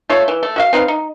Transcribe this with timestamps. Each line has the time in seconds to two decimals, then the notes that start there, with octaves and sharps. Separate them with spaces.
0.10 A3 F4 C#5
0.28 E3
0.43 A3
0.56 F#4 E5 F5
0.73 C4 D#4 B4 F5
0.88 D#4